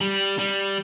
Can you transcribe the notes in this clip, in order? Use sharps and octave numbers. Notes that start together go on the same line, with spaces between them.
G3
G3